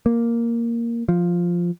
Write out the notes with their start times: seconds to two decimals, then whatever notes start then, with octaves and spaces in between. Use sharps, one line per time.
0.06 A#3
1.09 F3